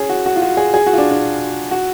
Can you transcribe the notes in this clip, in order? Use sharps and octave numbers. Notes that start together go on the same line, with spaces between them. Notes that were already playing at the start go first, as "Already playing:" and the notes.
Already playing: C#4 G#4
F#4
F#4
F4
F#4
G#4
G#4
F#4
F4
D4
D4
F#4